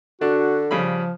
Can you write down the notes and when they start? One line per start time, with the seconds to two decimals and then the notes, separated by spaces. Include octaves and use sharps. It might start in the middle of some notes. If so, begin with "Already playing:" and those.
0.21 D3 D4 F#4
0.71 C#3 F3 G3 B5